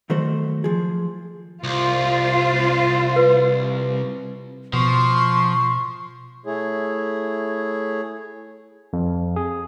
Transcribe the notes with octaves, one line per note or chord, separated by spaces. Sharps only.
D#3 F#3 A3 F#4 C5
F3 G#4
C2 F4 C5
B4
B2 F3 C6 C#6
A3 E4 G#4 C#5
F2
G#4